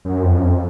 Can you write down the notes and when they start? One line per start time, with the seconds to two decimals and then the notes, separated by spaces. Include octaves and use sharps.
0.05 F#2
0.23 F2
0.37 F#2
0.43 F2